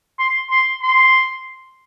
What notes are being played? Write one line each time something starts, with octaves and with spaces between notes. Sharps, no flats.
C6
C6
C6